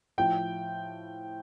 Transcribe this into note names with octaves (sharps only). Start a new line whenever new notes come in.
A2 F3 G5